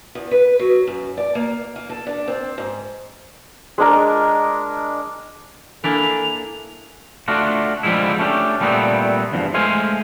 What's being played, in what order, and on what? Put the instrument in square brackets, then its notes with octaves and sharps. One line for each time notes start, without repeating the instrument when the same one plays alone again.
[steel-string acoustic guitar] E2
B4
F#3
F#2
D5
A#3
A#3
A4
D4
C4
G#2
[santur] G#3 D4 A#4
[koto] A#3 D4 E4 [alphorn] A4 [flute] G#5 [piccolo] F7
[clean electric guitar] A3 D4 F4 F#4
D3 F3 G3 G#3 E4
A3 C#4 D4 G4
A#2 G3 A3 B3 C4
E2 G2 F3
G#3 A3 C5 F5 G#5